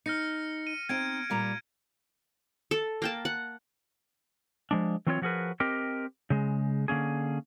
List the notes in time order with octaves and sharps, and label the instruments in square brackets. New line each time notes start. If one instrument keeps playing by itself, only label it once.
[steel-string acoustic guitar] D#4 [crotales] F6 A#6 C#7
[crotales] D#7
[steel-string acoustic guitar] C4 D#4 [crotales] G#6 D7
[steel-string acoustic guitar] A#2 G3 A#5
[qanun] A4
A#3 G5 A5
F#5
[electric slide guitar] F3 G#3 D4
E3 F#3 C4 F4 A#4 C#5
F3 F#3 F#4 G#4 A#4 B4
C4 G4 A#4 D#5
C#3 G#3
D3 A#3 C#4 G#4